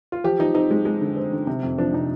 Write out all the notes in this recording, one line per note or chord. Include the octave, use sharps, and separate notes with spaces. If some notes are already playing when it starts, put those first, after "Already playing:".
F4
F3 G4
F3 D#4
C4 D#4
G#3
G#3
D3
C4
D3
C3
F2
F3 D4
C3 D#4